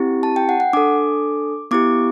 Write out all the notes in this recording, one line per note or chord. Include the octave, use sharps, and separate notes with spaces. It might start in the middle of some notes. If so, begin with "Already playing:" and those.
Already playing: C4 E4 G4
A5
G5
F#5
F#5
D4 A4 D6
B3 E4 G4 D6